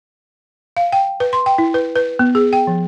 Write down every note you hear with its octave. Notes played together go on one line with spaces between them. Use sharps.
F5
G5
B4
C6
G5
E4
B4
B4
B3
G#4
G5
F3